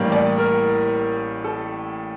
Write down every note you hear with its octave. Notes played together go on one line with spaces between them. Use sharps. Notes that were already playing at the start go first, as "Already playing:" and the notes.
Already playing: A1 A2 G3 A#3
D5
A#4
A4